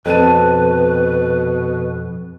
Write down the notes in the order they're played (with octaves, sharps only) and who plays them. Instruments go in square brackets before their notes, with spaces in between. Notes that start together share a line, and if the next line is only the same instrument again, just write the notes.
[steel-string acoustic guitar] F2 [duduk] B2 [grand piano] A4 A5 D#7 [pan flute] B4